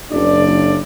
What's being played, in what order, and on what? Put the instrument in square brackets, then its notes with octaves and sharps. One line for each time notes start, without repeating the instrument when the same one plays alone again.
[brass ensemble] F#1 C#3 D4 D5